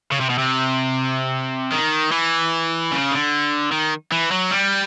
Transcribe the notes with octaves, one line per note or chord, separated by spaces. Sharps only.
C#3
C3
B2
C3
D#3
E3
C#3
D3
D#3
E3
F#3
G3